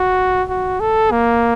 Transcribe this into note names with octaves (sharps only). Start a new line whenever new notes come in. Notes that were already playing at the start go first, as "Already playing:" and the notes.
Already playing: F#4
F#4
A4
A#3